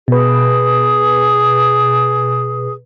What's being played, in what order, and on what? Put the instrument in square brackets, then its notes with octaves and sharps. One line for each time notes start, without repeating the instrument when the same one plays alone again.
[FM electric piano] B2 B4 [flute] G#4